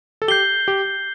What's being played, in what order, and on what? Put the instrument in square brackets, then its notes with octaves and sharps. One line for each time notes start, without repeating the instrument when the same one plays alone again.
[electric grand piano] A4
[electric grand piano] G4 [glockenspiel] G6 C7 G7
[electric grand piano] G4